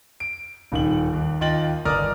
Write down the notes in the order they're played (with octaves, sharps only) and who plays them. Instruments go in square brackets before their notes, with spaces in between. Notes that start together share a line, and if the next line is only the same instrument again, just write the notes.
[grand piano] D7
D#1 D#3 F#7
D#2
D#2 F4 D#5 G5 A6 F#7
G1 A#4 D5 A#5 D#6 F6